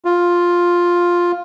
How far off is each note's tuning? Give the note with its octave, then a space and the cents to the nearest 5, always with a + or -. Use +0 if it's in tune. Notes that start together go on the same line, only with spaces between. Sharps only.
F4 +5